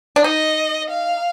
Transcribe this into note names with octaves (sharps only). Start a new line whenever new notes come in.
D4
D#4 D#5
F5